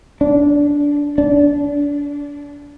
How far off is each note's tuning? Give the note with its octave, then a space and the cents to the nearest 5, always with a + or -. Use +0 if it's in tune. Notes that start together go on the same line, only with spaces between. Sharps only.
D4 -15
D4 -30